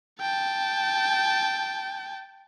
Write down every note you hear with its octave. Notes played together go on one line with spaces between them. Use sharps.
G5 A5